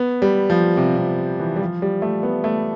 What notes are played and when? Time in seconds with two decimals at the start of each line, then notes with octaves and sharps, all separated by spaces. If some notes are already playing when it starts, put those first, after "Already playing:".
Already playing: B3
0.22 G3
0.50 F3
0.77 C3
0.98 C3
1.40 E3
1.56 G3
1.61 F3
1.82 G3
2.02 A3
2.23 B3
2.44 A3